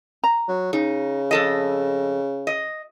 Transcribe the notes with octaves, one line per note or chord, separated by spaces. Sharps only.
A#5
F#3
C#3 D#4
F2 A4 D#5
D#5